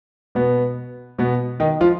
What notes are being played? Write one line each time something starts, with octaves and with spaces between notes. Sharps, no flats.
B2 B3
B2 B3
D#3 D#4
F3 F4